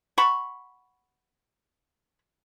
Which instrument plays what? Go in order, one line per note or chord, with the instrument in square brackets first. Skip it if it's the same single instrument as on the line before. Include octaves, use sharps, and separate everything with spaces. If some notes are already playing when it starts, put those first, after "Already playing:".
[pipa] F#5 A5 B5 C#6